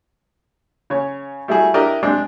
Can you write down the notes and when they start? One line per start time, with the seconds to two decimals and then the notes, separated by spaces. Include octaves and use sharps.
0.90 C#3 C#5
1.48 G3 A3 E4 F#4 G#4
1.74 D4 E4 G4 A#4 D5 D#5
2.03 C3 G#3 C4 D4